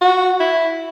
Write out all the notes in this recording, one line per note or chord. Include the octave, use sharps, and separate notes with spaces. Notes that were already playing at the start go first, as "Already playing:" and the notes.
F#4
E4